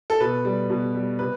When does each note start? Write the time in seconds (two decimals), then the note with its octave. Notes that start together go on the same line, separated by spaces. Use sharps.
0.10 A4
0.20 B2 B4
0.45 G3
0.70 B2
0.95 G3
1.19 C3 B4